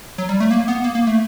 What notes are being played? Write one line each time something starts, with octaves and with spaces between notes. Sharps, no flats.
F#3
G3
A3
A#3
B3
A#3
A#3
A3